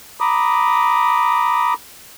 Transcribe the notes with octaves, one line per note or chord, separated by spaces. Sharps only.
A#5 B5 D6 D#6